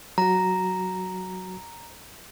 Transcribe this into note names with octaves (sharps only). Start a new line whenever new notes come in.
F#3 F#4 A#5